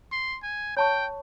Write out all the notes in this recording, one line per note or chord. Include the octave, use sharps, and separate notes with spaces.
C6
G#5
C#5 G5 A5 C#6